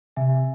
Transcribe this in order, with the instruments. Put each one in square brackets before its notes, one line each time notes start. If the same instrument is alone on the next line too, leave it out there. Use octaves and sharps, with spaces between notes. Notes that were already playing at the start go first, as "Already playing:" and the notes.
[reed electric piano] C3 [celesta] E5 G#5